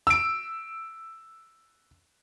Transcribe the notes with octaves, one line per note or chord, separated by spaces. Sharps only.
E6 D7